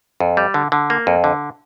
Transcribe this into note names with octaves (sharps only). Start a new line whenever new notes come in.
F2
G3
D3
D3
A#3
F2
D3